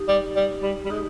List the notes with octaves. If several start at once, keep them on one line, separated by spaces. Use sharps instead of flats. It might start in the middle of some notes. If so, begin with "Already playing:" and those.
Already playing: D#4 G4
G3
G3
G3
G3
G#3 D#4 G4